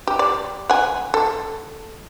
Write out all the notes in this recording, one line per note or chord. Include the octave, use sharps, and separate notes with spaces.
G4
D5
F#5 G#5
A4